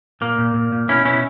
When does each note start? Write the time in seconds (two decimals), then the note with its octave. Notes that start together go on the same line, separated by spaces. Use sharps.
0.21 A#2 A#3
0.38 A#2
0.54 A#2
0.72 A#2
0.88 B2 C#4 E4
1.05 B2 C#4 E4